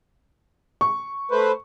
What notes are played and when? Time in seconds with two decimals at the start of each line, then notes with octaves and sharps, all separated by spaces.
0.81 C#6
1.31 A3 B4 C5